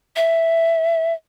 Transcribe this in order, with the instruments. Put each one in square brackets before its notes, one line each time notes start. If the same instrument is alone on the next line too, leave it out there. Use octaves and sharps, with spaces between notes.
[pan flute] E5